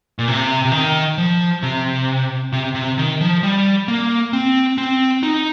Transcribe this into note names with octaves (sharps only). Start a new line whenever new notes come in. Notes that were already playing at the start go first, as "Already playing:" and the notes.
A#2
C3
C3
D#3
F3
C3
C3
C3
D#3
F3
G3
A#3
C4
C4
D#4